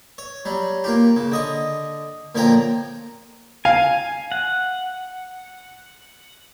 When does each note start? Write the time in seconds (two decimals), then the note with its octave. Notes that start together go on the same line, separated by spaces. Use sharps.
0.18 C#5
0.45 F#3 G3
0.84 A#3 F4 G4
1.16 C#3
1.31 D3 D#5 C#6
2.35 A#2 D3 F3 C#5 G5 A#5
3.65 F5 G#5
4.32 F#5